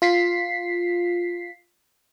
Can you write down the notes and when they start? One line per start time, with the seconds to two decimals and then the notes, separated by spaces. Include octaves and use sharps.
0.02 F4 B6 C7